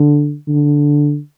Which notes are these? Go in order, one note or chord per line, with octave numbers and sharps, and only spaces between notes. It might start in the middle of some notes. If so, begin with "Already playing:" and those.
Already playing: D3
D3